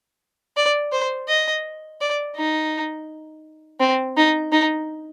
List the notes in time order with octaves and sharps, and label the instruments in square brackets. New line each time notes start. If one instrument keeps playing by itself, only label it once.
[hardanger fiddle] D5
C5
D#5
D5
D#4
C4
D#4
D#4